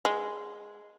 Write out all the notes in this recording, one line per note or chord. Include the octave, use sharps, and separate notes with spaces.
G#3